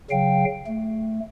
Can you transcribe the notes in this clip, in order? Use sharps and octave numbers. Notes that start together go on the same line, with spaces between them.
C#3 F#3 F5 G5
A3